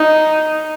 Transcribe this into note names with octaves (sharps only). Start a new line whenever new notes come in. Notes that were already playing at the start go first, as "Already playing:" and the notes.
Already playing: D#4